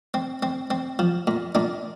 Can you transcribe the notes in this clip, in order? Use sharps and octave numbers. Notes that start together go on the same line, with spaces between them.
C4
C4
C4
F3
A#2
A#2 D4